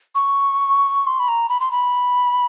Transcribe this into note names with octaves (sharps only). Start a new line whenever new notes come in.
C#6
C6
B5
A#5
B5
C6
B5